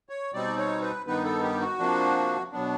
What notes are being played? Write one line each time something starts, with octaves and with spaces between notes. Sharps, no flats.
C#5
B2 G3 C4 D#4 D5
C#5
B4
G2 D#3 G3 B3 D#4 B4
A4
G4
F#4
C3 F3 A#3 D4
B2 F#3 B3 D4